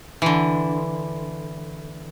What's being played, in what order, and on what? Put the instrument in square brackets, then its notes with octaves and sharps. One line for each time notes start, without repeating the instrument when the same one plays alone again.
[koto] D3 E3